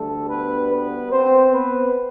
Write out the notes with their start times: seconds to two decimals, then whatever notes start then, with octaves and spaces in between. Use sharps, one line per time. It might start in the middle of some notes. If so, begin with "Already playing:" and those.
Already playing: D2 D3 G3 A3 A4
0.30 B3 B4
0.71 B3 B4
1.13 C4 C5
1.53 B3 B4